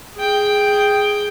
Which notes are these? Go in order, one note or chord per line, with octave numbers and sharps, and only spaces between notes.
G#4 G5